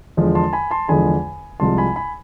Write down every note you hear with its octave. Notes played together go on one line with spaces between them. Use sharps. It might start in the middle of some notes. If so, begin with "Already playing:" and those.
E2 D3 F3 G#3
A5 C6
G#5 B5
A5 C6
E2 D3 F3 G#3 G#5 B5
C2 C3 F3 G#3 A5 C6
G#5 B5
G#5 B5